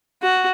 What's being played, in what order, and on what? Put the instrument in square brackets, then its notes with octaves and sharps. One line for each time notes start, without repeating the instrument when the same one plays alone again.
[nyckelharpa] F#4